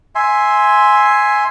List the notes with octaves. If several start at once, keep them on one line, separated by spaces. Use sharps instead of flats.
E5 G#5 C6